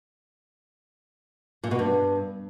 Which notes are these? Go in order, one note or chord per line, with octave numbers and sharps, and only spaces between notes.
A#2
B2
G2